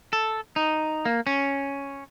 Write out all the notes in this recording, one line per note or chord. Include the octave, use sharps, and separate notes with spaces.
A4
D#4
A#3
C#4